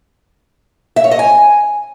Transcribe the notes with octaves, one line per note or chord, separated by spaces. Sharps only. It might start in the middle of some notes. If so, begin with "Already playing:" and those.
E5
C#5
D#5
G#5